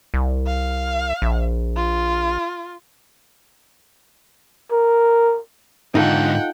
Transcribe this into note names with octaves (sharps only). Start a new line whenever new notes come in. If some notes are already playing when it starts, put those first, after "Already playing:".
C2
F5
A#1
F4
A#4
G#2 D3 D#4 F4 A4 F#5 G5